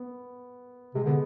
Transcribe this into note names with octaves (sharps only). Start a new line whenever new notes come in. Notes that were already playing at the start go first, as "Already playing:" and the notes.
Already playing: B3
C3 G#3
D3 B3